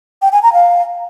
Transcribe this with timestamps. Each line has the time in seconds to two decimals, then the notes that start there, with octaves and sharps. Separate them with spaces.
0.22 G5
0.32 G#5
0.43 A#5
0.53 F5